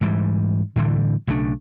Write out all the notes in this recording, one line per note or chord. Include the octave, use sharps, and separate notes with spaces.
G#2 E3 G3
A2 D3 E3 G3
B1 C#3 A3 D4